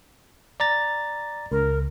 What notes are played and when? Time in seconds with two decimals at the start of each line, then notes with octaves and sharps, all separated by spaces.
0.60 D5 A#5 A6
1.52 C#2 A#4